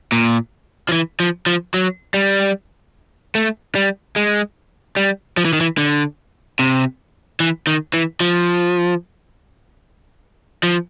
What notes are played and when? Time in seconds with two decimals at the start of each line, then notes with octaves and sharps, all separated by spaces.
0.12 A#2
0.89 F3
0.92 E3
1.20 F3
1.46 F3
1.74 F#3
2.14 G3
3.35 A3
3.75 G3
4.16 G#3
4.96 G3
5.37 F3
5.45 E3
5.53 D#3
5.61 E3
5.77 D3
6.59 C3
7.40 E3
7.67 D#3
7.94 E3
8.21 F3
10.63 F3